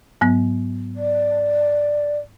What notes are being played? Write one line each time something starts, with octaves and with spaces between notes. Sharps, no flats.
G#2 F#3 B3
D5